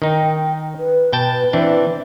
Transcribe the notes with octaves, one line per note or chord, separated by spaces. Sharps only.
D#3 D#4 G5
B4
B2 G5 A5
E3 C4 D4 E5